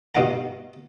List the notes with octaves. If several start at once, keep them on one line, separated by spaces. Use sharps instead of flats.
G2 B2 D#4 F5 F#5 A#5